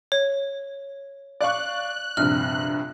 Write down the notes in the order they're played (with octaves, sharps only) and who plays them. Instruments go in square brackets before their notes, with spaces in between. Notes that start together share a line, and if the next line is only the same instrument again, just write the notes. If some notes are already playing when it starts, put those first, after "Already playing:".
[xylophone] C#5
[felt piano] D5 F5 C#6 [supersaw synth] F#6
[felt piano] A#1 G2 C3 [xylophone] F6